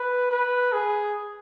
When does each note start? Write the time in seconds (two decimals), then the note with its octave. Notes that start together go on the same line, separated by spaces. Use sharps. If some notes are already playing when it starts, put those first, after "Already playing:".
Already playing: B4
0.31 B4
0.73 G#4